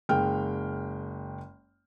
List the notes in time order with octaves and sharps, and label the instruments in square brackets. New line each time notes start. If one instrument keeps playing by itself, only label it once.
[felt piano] F#1 G#3 G5 F6